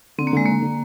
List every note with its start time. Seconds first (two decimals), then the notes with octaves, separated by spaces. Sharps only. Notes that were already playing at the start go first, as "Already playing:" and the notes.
0.18 D3 C4
0.27 A#3
0.33 D3 G#3
0.46 D3 A#3
0.62 D3